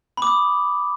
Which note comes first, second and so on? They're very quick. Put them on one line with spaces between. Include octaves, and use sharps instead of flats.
B5 D6 D#6